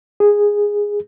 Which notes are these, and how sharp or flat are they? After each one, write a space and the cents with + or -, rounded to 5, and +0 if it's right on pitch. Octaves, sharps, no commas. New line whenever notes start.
G#4 -10